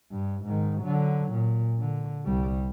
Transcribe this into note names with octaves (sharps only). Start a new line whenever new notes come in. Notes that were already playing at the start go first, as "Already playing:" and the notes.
G2
G#2 D#3
D3 F#3
A#2
D3
C2 G3